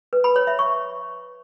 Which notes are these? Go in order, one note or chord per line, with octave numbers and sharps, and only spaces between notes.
B4
B5
C#5
E5
C#6